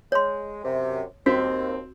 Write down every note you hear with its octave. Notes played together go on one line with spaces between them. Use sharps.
G#3 C#5 C6
F#2 C3
D#2 C4 F#4